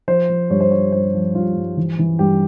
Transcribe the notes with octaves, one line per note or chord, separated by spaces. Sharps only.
F3 C5
F3
G2 C#5
C5
F3 C#5
G2 C5
F3
G2 F4
G2
E3
E3
G2 G4